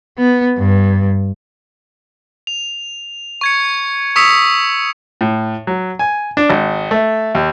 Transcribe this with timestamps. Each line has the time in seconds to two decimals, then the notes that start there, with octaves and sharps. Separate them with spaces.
0.18 B3
0.58 G2
2.47 F7
3.41 C#6 G#6 C#7
4.16 C#6 D#6 E6 B6 C#7 F7
5.21 A2
5.67 F#3
5.99 G#5
6.37 D4
6.50 G#1
6.91 A3
7.35 D#2